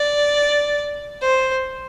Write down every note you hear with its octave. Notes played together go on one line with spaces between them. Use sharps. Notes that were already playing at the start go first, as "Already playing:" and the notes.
Already playing: D5
C5